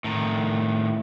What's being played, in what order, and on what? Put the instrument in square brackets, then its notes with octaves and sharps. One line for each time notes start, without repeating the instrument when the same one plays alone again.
[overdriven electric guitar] A2 D#3